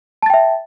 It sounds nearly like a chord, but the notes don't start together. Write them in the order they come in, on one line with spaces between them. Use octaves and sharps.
A5 A6 G5 E5